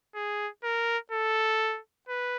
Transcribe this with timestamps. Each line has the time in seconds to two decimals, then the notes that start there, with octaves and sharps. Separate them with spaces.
0.15 G#4
0.64 A#4
1.12 A4
2.09 B4